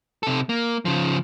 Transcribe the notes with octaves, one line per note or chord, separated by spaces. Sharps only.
C3 A4
A#3
C#3 F3